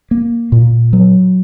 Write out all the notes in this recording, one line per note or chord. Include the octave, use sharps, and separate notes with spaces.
A#3
A#2
F#3